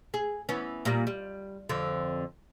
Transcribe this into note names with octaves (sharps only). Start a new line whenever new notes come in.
G#4
E3 B3 C#4
A#2 G3
G3
F2 D3